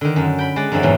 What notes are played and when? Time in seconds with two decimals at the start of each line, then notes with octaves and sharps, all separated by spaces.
0.01 D3 D#3
0.16 F#2 D3
0.39 G5 B5
0.56 G#3 D5 F#5
0.72 F#2 D3 E3 C4 C#4 D5
0.83 E2 G#2 B2 E3